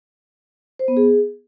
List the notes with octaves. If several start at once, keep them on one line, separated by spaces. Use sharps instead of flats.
C5
B3
G#4